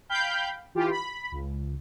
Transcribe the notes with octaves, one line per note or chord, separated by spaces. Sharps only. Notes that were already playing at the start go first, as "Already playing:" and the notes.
F5 G5 B5 G6
E3 F4 G4
B5
C#2